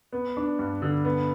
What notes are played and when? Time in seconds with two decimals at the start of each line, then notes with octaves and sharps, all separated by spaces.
0.13 B3
0.37 D4
0.59 G2
0.82 D3
1.05 B3